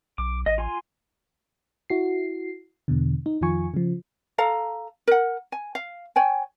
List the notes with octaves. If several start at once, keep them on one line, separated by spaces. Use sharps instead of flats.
B1 D6
A1 D#5
F4 G#5 C6
E4 F#4 C7
E2 B2 D3
D#4
F2 D#3 F3 F4 G#5 C#6
C#3 F3
A4 F5 A#5
A#4 F#5
G#5
F5
C#5 G5 G#5